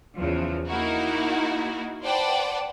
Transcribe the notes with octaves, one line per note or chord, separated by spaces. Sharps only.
E2 C#3 F3
A#3 D#4 E4 F#4 A#4
B4 C5 D5 F#5 G5 A5